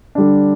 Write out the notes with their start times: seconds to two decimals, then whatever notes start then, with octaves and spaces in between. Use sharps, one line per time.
0.15 D3 G3 D4